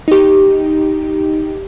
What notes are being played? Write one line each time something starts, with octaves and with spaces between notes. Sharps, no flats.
D#4 G4